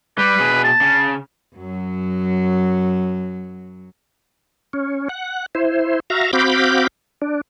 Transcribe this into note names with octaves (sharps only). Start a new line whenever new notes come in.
G3 B4
B2 G#4
A5
C#3
F#2 F#3
C#4
F#5
E4 C5
F#4 E5 F5 A#5
C4 F#4 F5 B5 D6 G6
D4